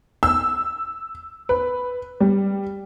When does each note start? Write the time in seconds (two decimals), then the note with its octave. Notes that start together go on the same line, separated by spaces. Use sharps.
0.23 E6
1.49 B4
2.20 G3